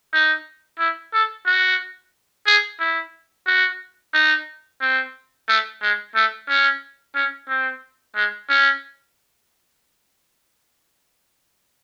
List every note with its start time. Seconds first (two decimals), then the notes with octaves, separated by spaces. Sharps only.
0.13 D#4
0.79 E4
1.13 A4
1.46 F#4
2.47 G#4
2.80 E4
3.47 F#4
4.14 D#4
4.81 C4
5.49 A3
5.82 G#3
6.15 A3
6.48 C#4
7.15 C#4
7.49 C4
8.15 G#3
8.49 C#4